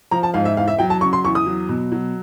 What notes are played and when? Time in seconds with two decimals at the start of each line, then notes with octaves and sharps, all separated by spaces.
0.11 F3 A#5
0.23 A5
0.34 G#2 F5
0.45 E5
0.57 E2 F5
0.68 E5
0.79 F#3 G5
0.90 A5
1.01 C#3 C#6
1.13 C6
1.25 E2 C#6
1.35 D#6
1.46 F#3
1.69 B2
1.92 F#3